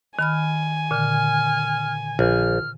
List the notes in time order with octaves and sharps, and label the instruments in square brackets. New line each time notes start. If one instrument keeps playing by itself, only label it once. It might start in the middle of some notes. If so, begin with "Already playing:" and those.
[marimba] D#3 B5 F6 [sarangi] G#5
[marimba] A#2 D3 [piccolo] F6
[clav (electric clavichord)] A#1 [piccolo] F6